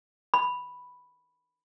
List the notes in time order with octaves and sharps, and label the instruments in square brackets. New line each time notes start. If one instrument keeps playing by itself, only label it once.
[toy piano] B5